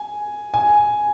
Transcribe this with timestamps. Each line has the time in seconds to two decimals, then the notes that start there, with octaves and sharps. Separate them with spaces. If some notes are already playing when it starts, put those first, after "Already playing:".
Already playing: G#5
0.54 G#5